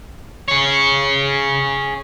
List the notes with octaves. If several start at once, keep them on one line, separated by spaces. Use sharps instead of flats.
G#4 C#5